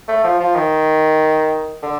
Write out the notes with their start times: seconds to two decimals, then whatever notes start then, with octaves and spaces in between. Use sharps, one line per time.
0.08 A3
0.24 F3
0.40 F3
0.56 D#3
1.83 D3